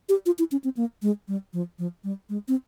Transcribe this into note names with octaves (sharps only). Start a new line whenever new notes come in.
G4
F4
E4
C#4
C4
A#3
G#3
G3
F3
F3
G3
G#3
C4